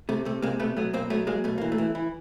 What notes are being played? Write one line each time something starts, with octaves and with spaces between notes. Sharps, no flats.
C3 A3
C3 A3
C3 G#3 A#3
B2 A3 B3
F#3 A3 B3
B2 A#3 C4
F#3 A3 B3
F#3 G#3 A#3
B2 A3
E3 A#3
A3
E3
E3